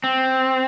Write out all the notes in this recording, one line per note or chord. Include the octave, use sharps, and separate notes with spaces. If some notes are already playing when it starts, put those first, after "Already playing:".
C4